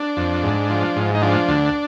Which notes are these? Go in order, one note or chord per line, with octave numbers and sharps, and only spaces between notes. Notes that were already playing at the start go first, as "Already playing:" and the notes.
Already playing: D4
F2
G#2
F3
G#2
D#4
F3 D4
D2